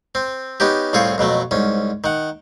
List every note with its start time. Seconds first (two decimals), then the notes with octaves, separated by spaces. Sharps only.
0.15 C4
0.60 B3 C#4 D#4 G4
0.93 C2 A2 C4 F4 G#4 C#6
1.18 F2 B2 F#3 A3
1.51 C2 G#2 C#4
2.04 D#3 F#5